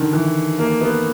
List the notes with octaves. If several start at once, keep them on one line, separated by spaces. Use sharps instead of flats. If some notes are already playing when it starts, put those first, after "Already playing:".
Already playing: D3 D#3
E3
A#3
B3